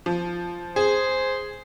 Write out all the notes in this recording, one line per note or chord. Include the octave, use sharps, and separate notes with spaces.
F3
G#4 C5